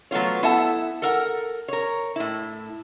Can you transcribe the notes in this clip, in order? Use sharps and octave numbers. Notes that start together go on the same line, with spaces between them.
F#3 A3 B3 F4 C#5
B3 E4 A4 E5 F#5 A5
A4 A#4 F#5
A#4 C#5
A2 E4